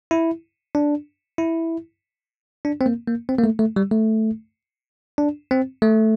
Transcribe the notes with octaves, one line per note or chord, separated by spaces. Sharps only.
E4
D4
E4
D4
C4
A#3
A#3
C4
A#3
A3
A3
G3
A3
D4
C4
A3